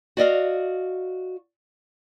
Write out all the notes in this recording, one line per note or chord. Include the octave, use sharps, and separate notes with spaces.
F#4 D5 D#5 F5